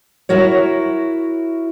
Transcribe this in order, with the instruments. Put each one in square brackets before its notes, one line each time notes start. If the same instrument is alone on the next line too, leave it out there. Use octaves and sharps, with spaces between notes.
[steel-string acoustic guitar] E4 F#4 A#4 C#5